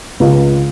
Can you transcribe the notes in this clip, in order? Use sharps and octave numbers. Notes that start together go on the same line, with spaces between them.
C#2